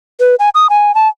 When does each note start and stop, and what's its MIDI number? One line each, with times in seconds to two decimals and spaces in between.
0.20 0.35 71
0.39 0.49 80
0.55 0.70 87
0.70 0.94 80
0.95 1.08 81